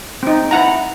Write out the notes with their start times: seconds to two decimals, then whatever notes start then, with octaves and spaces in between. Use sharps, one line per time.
0.23 C4 D#4
0.51 E4 F#5 A#5